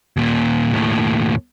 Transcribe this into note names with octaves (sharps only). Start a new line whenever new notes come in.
D#2 A#2
D#2 A2